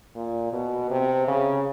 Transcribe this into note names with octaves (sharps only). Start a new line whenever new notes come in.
A#2
B2
C3
C#3